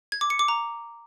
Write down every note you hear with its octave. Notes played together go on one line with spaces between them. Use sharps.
G#6
D6
C#7
D6
A#5